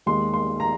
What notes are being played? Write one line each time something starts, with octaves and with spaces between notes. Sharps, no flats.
D#2 D#3 G#3 C6
C6
A#5